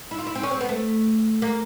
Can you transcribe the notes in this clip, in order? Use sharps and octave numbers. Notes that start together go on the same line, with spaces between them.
E4
F4
E4
C4
C#4
C4
B3
A3
A#3